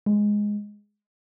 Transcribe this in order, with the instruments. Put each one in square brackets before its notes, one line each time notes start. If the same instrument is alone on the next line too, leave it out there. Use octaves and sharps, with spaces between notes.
[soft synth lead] G#3